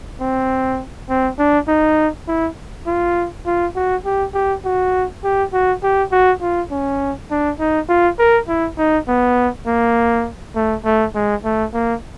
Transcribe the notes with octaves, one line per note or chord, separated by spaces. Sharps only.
C4
C4
D4
D#4
E4
F4
F4
F#4
G4
G4
F#4
G4
F#4
G4
F#4
F4
C#4
D4
D#4
F4
A#4
E4
D#4
B3
A#3
A3
A3
G#3
A3
A#3